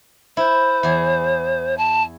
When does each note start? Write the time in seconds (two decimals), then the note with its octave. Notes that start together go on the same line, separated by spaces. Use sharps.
0.37 E4 C5
0.83 E2 G#4
1.77 A5